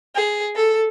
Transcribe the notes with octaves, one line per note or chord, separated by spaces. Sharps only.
G#4
A4